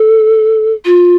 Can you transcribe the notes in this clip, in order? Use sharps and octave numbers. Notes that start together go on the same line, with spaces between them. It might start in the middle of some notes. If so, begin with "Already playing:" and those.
Already playing: A4
F4